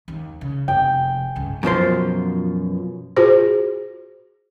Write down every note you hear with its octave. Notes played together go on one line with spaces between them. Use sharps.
D#2
C#3
F1 G#4 G5
C#2 G2
F#2 B2 F3 C6
F4 F#4 G#4 C5